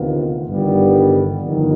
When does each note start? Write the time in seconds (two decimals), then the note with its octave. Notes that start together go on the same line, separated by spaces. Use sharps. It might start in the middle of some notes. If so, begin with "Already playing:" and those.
Already playing: D2 C3 D#3 B3 F4
0.47 G1 G2 D#3 G3 B3
1.42 G1 F2 D#3